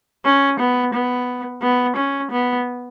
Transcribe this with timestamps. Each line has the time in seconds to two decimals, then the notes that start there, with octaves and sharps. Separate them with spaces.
0.25 C#4
0.60 B3
0.94 B3
1.62 B3
1.96 C#4
2.31 B3